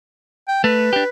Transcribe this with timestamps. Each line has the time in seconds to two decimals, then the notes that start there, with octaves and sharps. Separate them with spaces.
0.48 G5
0.64 A3 B4
0.93 D4 G4